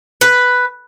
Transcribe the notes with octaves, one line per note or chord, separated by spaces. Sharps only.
B4